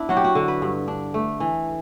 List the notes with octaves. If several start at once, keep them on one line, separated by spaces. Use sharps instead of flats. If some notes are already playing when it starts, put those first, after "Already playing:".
Already playing: B3 D4 E4
F#3 F#4
G4
F#4
D3
B4
G2
D4
A3
E3